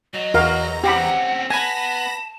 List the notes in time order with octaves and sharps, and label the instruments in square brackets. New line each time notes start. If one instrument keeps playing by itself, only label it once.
[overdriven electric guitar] F#3 [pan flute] D#5
[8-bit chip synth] E2 A#5 [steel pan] F#4 A#4 F5
[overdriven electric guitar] C4 C#4 [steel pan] G4 B5 [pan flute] F#5
[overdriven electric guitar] B3 [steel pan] G#5 [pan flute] A5 [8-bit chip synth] B5 A#6